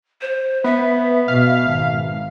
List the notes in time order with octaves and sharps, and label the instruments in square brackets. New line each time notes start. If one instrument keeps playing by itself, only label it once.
[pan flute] C5
[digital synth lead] B3 [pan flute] E5
[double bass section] B2 [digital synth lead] F5
[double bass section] G#1